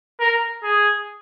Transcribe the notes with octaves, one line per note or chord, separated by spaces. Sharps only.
A#4
G#4